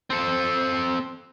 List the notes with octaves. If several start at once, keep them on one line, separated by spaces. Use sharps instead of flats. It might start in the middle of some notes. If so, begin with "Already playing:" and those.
C4 A4